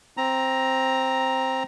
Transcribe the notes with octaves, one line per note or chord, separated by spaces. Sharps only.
C4 A#5